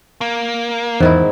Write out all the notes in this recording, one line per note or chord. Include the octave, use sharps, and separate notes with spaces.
A#3
E2 G#2 D#3 E4